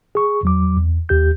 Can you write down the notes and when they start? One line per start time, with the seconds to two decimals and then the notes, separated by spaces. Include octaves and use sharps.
0.15 G#4 C#6
0.43 E2 F#3 D6
0.77 E2
1.09 D#2 G4 G6